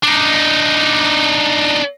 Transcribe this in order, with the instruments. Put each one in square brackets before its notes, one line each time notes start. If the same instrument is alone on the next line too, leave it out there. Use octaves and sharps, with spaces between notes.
[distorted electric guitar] D4 D#4